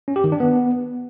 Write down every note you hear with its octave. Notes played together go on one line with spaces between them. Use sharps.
C#4
G4
D#3
D4
B3